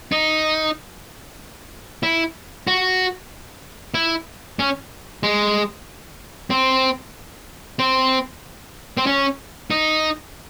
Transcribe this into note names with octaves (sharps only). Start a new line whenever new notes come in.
D#4
E4
F#4
E4
C#4
G#3
C4
C4
C4
C#4
D#4